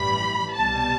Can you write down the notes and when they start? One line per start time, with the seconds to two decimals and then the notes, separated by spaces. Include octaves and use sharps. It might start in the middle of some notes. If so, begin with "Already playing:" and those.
Already playing: A1 G2 E3 G3 B5
0.56 C2 B2 G3 A5